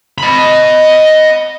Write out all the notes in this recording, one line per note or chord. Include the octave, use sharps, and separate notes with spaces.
D#5 B5